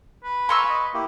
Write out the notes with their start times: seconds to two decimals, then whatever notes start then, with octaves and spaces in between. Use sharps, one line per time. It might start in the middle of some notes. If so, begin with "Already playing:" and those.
0.24 B4
0.49 F5 G#5 A#5 C6 C#6 E6
0.69 D#5
0.94 A#3 E4 G4